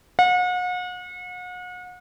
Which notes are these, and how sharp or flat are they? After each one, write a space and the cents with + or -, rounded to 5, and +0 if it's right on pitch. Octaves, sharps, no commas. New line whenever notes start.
F#5 -40